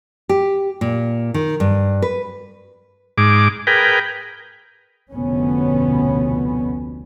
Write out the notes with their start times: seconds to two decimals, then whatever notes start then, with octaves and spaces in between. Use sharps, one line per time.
0.29 G4
0.81 A#2
1.34 D#3
1.60 G2
2.02 B4
3.18 G#2 D6
3.67 G#4 A#4 B4 G5
5.11 F1 D2 B2 B3 C#4